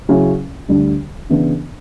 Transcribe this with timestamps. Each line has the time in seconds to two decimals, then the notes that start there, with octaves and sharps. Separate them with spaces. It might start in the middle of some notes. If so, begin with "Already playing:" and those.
0.09 C#3 F#3 C#4 E4
0.69 D2 D3 G3
1.29 C#3 E3 B3 D4